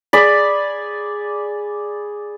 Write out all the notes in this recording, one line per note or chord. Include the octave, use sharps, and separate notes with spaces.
G#4 D5 B5